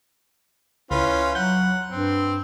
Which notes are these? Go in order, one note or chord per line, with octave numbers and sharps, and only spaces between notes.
C#2 C#4 E4 F4 B4
F#3 F#5 G6
G2 C4